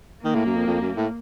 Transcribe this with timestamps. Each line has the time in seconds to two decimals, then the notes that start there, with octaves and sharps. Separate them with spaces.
0.24 D#3 A#3
0.35 A2
0.46 F#2
0.56 F2
0.67 F2
0.81 F#2
0.96 A2